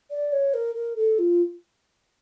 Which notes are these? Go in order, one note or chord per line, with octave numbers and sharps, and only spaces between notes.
D5
C#5
A#4
A#4
A4
F4